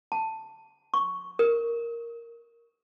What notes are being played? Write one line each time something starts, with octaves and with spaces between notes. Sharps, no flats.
A5
C#6
A#4